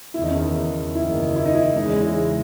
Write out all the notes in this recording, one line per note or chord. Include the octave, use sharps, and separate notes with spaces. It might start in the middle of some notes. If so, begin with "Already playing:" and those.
F#1 E2 D#3 E4
D#4
C#4
D#4
F#1 E2 D#3 E4
E4
D#4
E4
E2 C#3 G#3 D#4
E4